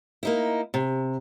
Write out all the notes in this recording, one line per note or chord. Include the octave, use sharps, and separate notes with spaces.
A#3 D#4 E4
C3